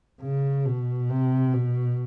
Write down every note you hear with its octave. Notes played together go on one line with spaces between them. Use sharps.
C#3
B2
C3
B2